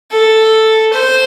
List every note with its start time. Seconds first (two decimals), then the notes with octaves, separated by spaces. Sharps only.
0.11 A4
0.93 C5